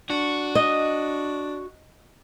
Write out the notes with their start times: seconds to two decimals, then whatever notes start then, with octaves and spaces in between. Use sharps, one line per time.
0.10 D4 F#4
0.55 D#5